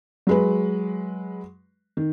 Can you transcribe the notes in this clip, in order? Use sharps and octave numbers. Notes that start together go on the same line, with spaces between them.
F#3 G#3 B4
D#3